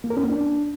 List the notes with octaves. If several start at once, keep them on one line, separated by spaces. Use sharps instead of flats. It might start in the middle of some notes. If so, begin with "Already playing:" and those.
A#3
A#4
C#4
A#3
D4